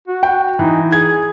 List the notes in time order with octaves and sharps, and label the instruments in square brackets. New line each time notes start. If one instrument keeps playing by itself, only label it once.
[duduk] F#4
[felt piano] G5
[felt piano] E3 [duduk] D#4
[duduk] G#4 [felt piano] G#6